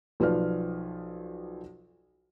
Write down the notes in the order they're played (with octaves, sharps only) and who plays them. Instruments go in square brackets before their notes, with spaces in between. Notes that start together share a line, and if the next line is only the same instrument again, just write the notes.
[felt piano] B1 F3 B4 D5 F6